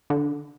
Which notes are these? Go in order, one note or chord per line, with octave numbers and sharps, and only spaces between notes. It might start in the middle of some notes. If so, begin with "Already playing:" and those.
D3